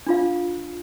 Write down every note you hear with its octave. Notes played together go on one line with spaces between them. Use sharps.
D4 F4 F5